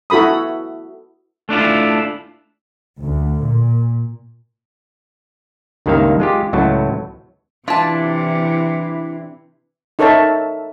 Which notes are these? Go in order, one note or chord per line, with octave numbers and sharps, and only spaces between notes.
E4 F#4 A4 B5 D#6
A3 D4 E4 F4
D2
A#2
C#2 G2 D#3 A#3 E5 F5
G#3 F4 G4
C#2 A2 F#3 E4 F#4 A5
C3 E3 D4 E4 F4 D5 A5
D#4 A4 A#4 C#5 E5 A5